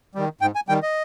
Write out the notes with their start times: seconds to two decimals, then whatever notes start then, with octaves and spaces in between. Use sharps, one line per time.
0.15 D#3 G3
0.41 G#2 G5
0.55 G#5
0.69 D#3 G3 G5
0.83 D#5